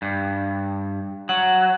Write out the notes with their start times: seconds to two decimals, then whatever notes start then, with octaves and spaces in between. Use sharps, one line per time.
0.02 G2
1.29 F#3 F#5